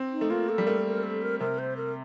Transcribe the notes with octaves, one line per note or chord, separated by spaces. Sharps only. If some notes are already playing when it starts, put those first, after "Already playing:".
Already playing: C4
D#4
A3
A#3 F4
A4
G3
A3 A#4
A#4
A4
A#4
C3 A#4
C5
A#4